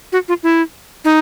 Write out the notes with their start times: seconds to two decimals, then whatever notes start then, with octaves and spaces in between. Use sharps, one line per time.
0.12 F#4
0.28 F4
0.43 E4
1.05 D#4